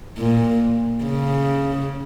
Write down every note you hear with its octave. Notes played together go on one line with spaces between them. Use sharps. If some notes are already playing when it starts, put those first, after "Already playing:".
A#2
C#3